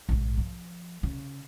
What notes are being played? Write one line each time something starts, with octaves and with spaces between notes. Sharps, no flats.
A#1 G#2
F3
C#3